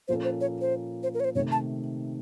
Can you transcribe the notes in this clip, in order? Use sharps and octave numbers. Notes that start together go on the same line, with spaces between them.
A#2 F3 A#3 C#4 A4 C5
C5
C#5
C5
C5
A#4
C#5
C5
C3 D#3 A3 C#5
A5